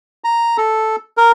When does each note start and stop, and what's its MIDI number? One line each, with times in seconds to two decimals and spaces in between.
0.24 0.57 82
0.58 0.96 69
1.17 1.32 70